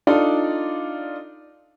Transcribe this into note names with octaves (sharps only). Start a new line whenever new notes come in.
D4 D#4 F4 A4 D5